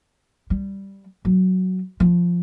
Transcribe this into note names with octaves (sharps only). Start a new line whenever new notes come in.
G3
F#3
F3